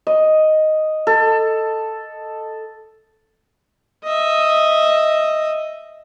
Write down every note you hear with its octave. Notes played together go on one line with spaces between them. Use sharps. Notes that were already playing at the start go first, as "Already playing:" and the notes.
D#5
A4
D#5 E5